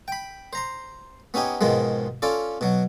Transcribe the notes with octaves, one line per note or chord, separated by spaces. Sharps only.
G5 B5
C5 A#5 C6
B3 C#4 D#4 G4 G#5
G#2 B2 D#3 F3 G#3
C#4 F4 A4 D5
B2 F#3